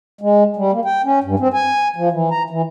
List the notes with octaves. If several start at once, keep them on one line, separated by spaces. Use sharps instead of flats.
G#3
G3
A#3
G5
C#4
G2
C4
G#5
F3
E3
A#5
E3